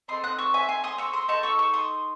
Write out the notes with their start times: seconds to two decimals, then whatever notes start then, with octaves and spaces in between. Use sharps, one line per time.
0.08 C4 D#4 A4 C6 D#6
0.24 D#6 F#6
0.38 C#6 E6
0.54 E5 G#5
0.69 G#5 C6
0.84 C6 D#6
0.98 C#6 E6
1.13 C6 D#6
1.28 D#4 A4 A5 C#6
1.43 C#6 E6
1.59 C#6 E6
1.74 C6 D#6